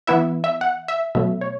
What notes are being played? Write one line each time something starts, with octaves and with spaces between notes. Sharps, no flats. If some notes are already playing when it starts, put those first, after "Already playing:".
E3 B3 E4 E5
E5
F#5
E5
B2 F#3 A3 E5
C#5